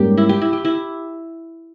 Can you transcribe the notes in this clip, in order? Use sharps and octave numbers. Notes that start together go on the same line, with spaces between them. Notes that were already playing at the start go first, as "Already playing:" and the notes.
Already playing: G#2 G3 A#3 C#4 G4
E4
G4
E4
G4
E4